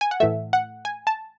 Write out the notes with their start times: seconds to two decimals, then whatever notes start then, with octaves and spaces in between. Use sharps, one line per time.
0.01 G#5
0.11 F#5
0.20 A2 E3 A3 E5
0.53 F#5
0.85 G#5
1.07 A5